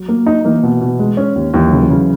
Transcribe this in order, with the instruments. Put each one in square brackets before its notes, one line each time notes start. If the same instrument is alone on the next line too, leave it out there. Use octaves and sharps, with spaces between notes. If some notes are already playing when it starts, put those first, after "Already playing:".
Already playing: [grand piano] F#3
[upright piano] A#3
D#4
[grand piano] E3 [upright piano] A#3
[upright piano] B2
B2
G#3
C#4
D#2
[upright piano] D#2 [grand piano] E3
[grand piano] F#3
[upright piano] C#3
[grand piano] E3
[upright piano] C#3 [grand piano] F#3